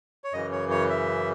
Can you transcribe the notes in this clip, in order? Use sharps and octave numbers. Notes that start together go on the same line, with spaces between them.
C#5
F#2 C#3 E3 D#5
C#5
C#5
E5